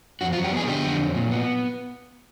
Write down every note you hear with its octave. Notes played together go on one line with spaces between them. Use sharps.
F2 F#4
F4
F#3
G4
B3 G#4
D3 G4
F2
F#3
A#2
B3